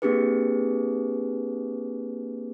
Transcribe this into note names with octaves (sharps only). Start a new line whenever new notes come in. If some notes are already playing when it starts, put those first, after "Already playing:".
A#3 C4 D4 G4 G#4 B4